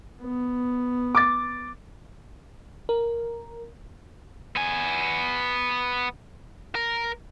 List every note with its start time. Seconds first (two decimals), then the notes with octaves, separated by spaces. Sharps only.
0.22 B3
1.15 D6 A6
2.89 A#4
4.56 B3 G#5
6.75 A#4